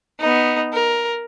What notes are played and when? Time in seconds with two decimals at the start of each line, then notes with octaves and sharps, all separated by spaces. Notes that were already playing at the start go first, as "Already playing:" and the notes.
0.19 B3 D#4
0.73 A#4